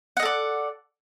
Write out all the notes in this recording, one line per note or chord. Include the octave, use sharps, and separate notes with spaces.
A4 D5 D#5 F#5